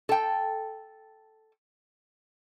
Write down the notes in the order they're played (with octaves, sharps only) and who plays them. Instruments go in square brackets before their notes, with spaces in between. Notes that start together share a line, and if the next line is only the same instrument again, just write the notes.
[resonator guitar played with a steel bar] A4 G5